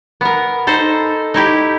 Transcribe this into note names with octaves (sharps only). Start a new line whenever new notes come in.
B3 A#4
D#4 A4 C5
D#4 E4 G4